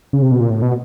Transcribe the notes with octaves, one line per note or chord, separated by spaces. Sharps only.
C#3
C3
B2
A#2
A2
B2